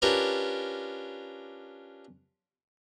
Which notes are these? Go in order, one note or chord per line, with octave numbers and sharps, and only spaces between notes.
C#4 D4 F4 G4 A#4 B4